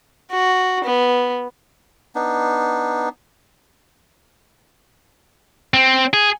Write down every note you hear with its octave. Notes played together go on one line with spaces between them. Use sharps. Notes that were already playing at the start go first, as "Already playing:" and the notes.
F#4
B3
B3 D4 D#4
C4
G#4